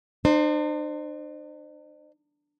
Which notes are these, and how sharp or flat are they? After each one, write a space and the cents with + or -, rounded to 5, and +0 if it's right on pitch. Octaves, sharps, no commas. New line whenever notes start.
D4 +45 C5 +0